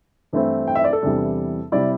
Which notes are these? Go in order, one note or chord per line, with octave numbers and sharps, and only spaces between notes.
G2 E3 A3 C4 E4
G5
E5
D5
A4
E2 C3 E3 G3 D4
C3 G3 E4 D5